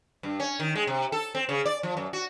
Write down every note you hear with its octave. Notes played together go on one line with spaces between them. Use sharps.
G2
C#4
D#3
G#3
C3
A4
C4
C#3
D5
F3
F#2
F#4